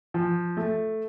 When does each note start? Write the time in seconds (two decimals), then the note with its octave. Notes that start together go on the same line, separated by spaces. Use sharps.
0.14 F3
0.57 A3